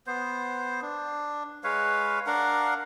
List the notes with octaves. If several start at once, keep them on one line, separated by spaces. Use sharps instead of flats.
B3 C5
D4
G#3 B4 C#5 F5
D4 A#4 F5 F#5